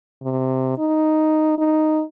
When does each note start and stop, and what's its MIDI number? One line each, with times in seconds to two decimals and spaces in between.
0.23 0.78 48
0.78 1.55 63
1.58 2.02 63